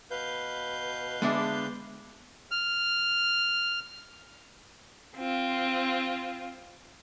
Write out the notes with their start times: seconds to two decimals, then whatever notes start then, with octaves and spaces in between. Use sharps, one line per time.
0.11 B2 B4 F5 G6
1.22 D3 G#3 B3 D4 G#4 E5
2.51 F6
5.16 C4 F4